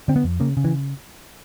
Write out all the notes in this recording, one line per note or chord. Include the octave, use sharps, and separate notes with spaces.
D3 C4
B3
F2
C#3 A#3
C#3
E3